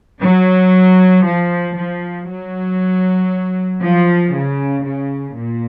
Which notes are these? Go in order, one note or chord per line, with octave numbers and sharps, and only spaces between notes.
F#3
F3
F3
F#3
F3
C#3
C#3
A#2